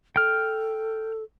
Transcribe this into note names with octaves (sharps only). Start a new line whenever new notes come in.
A4 G5 F6